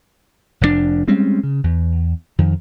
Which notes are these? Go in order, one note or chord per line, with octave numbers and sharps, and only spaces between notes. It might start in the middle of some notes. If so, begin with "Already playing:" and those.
F1 F2 C3 D4
G3 G#3 C4 C#4
C#3
E2
F2 D#3